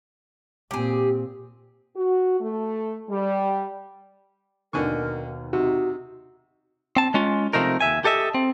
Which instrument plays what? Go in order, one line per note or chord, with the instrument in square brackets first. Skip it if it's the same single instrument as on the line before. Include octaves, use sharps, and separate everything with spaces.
[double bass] A#2 C4 [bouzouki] G4 G#4
[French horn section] F#4
A3
G3
[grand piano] D#2 B2 D#3 [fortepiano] D3 G#5 C#6 [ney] A#4
[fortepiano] C3 [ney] D#4 [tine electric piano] F#4
[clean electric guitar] C4 A5
G#3 C#4 F4
C3 D#3 F3 A3 D#4 A#4
D#2 E5 G#5
G4 A4 D#5 E5
C4